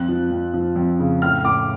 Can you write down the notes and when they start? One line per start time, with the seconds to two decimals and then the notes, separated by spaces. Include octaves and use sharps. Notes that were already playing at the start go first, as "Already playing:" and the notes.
Already playing: F2 F#6
0.08 F3
0.31 F2
0.54 F3
0.76 F2
0.99 C#3
1.22 A2 F6
1.44 A2 D6